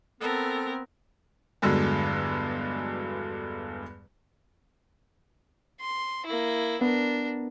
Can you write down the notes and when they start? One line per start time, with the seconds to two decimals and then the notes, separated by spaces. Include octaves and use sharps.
0.21 B3 C4 A4 A#4
1.62 E2 G2 D3 F#3 G#3
5.81 C6
6.26 A#3 E4
6.81 B3 D4 A#4